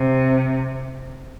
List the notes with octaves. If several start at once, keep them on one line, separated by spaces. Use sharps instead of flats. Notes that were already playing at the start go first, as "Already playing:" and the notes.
Already playing: C3